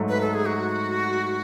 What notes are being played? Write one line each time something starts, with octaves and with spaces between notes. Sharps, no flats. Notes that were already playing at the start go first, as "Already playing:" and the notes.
Already playing: G#2 F#3 A3
B4
A4
G#4
F#4